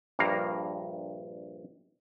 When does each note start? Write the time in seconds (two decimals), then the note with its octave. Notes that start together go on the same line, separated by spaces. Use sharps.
0.19 A#1 G2 A#3 F5 A#5